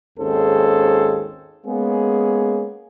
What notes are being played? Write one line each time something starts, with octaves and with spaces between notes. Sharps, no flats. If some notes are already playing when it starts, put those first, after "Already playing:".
G#1 D#2 C#4 G#4 A4 C5
G#3 A#3 B3 C#4 G#4